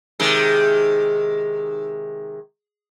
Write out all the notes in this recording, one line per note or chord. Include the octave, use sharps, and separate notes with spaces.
C3 D#3 G#3